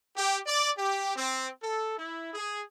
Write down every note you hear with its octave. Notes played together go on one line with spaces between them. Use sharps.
G4
D5
G4
C4
A4
E4
G#4